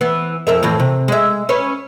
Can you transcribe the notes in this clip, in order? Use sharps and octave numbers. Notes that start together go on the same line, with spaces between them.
E3 B3
F2 A#4 E5
F2 A2 E3
C3
G#3 E5
C#4 B4 C#5